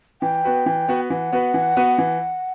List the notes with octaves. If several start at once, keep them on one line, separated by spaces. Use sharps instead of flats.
E3 G5
B3 F#4 B4
E3
B3 F#4 B4
E3 F#5
B3 F#4 B4
E3
B3 F#4 B4
E3